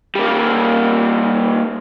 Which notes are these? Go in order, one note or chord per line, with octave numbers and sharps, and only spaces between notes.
G3 A#3